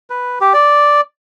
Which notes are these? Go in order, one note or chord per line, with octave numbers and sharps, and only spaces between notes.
B4
G4
D5